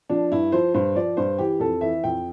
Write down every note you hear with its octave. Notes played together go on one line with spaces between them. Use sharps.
F3 D4
G2 E4
F3 C5
G2 C5
F3 D5
G2 C5
E3 G4
F2 A4
E3 E5
F2 G5